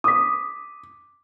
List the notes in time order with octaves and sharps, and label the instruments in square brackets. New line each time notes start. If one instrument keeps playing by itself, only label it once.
[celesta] D6 B6 [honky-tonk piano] D#6